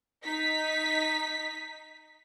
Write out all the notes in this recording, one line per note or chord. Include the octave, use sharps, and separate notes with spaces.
D#4 B6